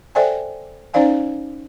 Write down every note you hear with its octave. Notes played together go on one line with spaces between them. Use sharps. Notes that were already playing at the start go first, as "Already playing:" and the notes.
A4 C5 D5 E5 G5 G#5
C#4 D#4 C5 D5 F5 G#5